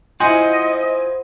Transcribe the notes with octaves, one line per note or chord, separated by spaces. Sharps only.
E4 F4 C5 D#5 F#5 G#5